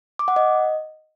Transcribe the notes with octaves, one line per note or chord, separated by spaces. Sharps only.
D6
F#5
D#5